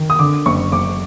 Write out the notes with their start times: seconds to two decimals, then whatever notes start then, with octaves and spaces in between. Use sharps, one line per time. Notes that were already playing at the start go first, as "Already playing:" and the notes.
Already playing: D#3
0.10 D#6
0.19 D3 D6
0.46 F#1 C#6
0.72 F#1 D6